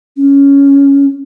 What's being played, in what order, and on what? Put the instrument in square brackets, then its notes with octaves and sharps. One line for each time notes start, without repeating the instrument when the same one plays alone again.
[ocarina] C#4